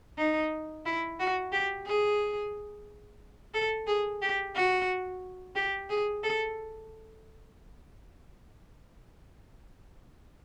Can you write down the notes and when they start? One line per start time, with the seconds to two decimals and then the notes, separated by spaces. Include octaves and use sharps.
0.18 D#4
0.85 E4
1.20 F#4
1.52 G4
1.87 G#4
3.54 A4
3.87 G#4
4.22 G4
4.55 F#4
5.55 G4
5.90 G#4
6.23 A4